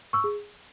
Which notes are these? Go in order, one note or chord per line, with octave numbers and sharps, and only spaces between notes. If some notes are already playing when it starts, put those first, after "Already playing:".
C#6 E6
G#4